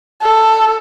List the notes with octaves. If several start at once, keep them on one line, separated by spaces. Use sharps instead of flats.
A4